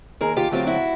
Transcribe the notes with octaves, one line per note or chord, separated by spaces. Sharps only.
D#2 G#4 A#4
F4 G4
D3 F#3 A3 C4 F4 G4
E4 F#4